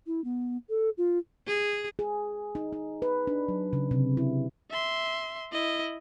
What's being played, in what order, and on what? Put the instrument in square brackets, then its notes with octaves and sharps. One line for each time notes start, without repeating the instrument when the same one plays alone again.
[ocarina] E4
B3
A4
F4
[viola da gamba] G#4
[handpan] G#4
D#4
D#4
B4
D4
F#3
C#3
C3
E4
[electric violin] E5 C6
E4 D#5